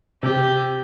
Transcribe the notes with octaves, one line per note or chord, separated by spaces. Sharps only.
C3 G4